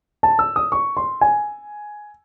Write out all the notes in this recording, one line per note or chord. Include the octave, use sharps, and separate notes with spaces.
A5
E6
D#6
C#6
C6
G#5